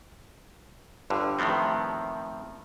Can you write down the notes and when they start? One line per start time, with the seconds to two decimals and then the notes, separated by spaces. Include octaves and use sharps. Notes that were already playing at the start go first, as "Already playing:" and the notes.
1.10 G1 G2 D3
1.39 A2 D#3 F3 B3 C4